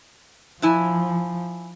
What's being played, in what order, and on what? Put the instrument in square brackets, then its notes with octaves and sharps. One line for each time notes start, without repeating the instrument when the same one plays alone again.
[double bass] F3 [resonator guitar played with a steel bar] D4 E4 G#5